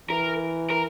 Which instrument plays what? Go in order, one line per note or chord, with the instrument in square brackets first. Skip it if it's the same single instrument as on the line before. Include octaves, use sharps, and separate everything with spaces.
[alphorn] E3 [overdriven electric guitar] A#4
[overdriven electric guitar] A#4